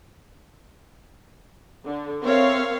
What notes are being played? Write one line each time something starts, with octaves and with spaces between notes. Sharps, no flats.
D3
C4 A#4 C#5 E5 F5